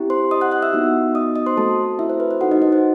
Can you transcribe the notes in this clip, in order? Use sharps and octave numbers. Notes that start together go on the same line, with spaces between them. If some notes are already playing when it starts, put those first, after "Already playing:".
Already playing: C4 E4 G4
C5 C6
D#5 D#6
F#5 F#6
F#5 F#6
E5 E6
B3 D#4 F#4
D#5 D#6
D#5 D#6
C5 C6
A3 C4 F#4 A4 A5
E4 E5
C5
B4
C5
D#4 F#4 A4 F#5
D#4 D#5
D#4 D#5
C5